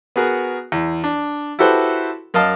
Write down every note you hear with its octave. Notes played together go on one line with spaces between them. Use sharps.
B3 F#4 G#4 A#4
E2
D4
E4 F#4 G4 A4 B4 C5
F#2 A#4 D#5 F5 A5